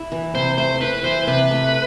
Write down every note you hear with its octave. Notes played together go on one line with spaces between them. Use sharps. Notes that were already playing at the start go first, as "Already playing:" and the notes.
Already playing: E4
E3
C3 C5
A3 C5
E4 B4
E3 C5
C3 B4
A3